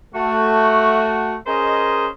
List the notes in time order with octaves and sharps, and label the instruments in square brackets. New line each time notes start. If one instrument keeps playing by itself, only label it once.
[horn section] A3 F#4
C#4 G#4 A#4 C5 D#5